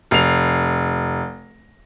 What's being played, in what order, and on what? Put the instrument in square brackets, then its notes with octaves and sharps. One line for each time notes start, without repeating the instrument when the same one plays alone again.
[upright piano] F1 C7 F7